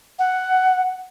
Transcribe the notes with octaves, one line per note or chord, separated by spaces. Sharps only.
F#5